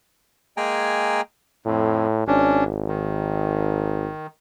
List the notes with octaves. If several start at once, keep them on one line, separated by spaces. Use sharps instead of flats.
G#3 A#3 G#4 G5 G#5 A#5
F2 A2
G#1 C#4 D4
D#3